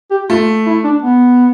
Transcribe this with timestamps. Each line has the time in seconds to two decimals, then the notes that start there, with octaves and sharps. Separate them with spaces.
0.11 G4
0.29 A3 F4
0.66 E4
0.84 D4
1.02 B3